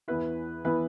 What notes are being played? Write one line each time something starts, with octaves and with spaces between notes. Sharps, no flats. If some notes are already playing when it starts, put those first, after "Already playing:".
E2 E3 B3 E4 B4
E3 B3 E4 B4